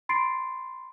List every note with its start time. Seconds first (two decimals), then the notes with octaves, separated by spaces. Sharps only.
0.09 B5 C6 A6 C7 D7